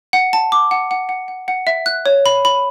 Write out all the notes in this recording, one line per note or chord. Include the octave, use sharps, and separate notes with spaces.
F#5
A5
D6
F#5
F#5
F#5
F#5
F#5
E5
F#6
C#5
B5
B5